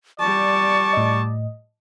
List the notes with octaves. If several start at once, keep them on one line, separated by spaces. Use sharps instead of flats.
G3 D5 A5 C#6
A2 D#5